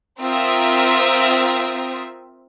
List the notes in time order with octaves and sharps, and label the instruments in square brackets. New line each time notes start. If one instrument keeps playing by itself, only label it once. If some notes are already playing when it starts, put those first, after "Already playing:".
[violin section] C4 F4 A#4 E5 D#6